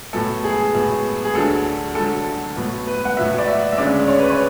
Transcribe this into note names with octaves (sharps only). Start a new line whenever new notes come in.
A2 F#3 B3 A4
G#4
A2 F#3 B3
G#4
D2 D3 F#3 A4
D2 D3 F#3 A4
A2 F#3 B3
B4
F#5
A2 F#3 B3 E5
D5
E5
E5
D2 C#3 G#3 C#4 D5
C#5
B4
C#5